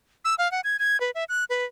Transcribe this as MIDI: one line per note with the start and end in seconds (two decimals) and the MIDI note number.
0.25 0.35 88
0.38 0.50 77
0.52 0.61 78
0.64 0.77 92
0.79 0.99 92
1.01 1.11 71
1.15 1.24 76
1.29 1.44 90
1.50 1.65 71